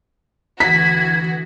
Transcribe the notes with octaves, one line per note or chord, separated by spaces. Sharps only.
D2 E3 F#4 G#6 B6